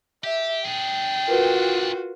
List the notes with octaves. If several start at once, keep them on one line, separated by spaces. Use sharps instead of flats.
G4 E5
D4 G#4 G5
F4 F#4 A#4 B4